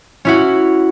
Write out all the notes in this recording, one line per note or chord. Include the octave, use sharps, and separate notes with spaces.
C#4 E4 F#4